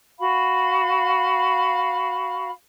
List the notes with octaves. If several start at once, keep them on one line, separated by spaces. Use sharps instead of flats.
F#4 F5 B5